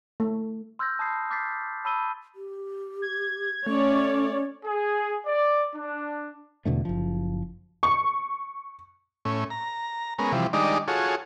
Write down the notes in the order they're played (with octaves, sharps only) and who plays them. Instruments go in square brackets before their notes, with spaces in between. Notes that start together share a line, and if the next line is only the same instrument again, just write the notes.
[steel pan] A3
[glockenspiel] C6 E6 F6 G6 G#6 A#6
A5 B5 D#6 G#6 C7
D6 F6 G6 A6 B6 C7
A5 B5 E6 D#7 G7
[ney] G4
[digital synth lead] G#6
[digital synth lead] A3 [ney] C#4 [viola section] C#5 D5
[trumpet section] G#4
D5
D4
[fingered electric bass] E2 B2 D3 A3
F#1 F3
[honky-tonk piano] C#6
[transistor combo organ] A2 C#4
A#5
G#3 B3 C#4 A#4
C3 E3 F3 G3
D#3 G3 G#3 D4 D#4 D5
F4 F#4 G#4 A4 C#5